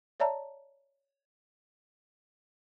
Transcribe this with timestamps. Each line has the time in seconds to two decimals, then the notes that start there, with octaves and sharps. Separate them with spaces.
0.20 C#5 D5 E5 A5 A#5